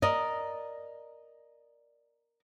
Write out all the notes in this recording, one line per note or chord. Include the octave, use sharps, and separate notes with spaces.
A#4 D5 D#5